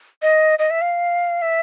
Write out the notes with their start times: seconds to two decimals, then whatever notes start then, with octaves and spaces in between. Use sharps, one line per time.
0.22 D#5
0.59 D#5
0.70 E5
0.81 F5
1.42 E5